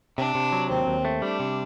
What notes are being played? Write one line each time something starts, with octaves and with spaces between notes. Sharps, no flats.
C3 D4
C3
F#3
D#2 C4
D#2
A3
G3 D4
C3